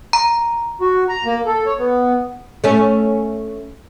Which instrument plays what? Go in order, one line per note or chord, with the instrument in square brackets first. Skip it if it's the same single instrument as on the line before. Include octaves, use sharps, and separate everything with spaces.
[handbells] A#5
[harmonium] F#4
A#5
A#3
A4
C#5
B3
[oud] A3 C#4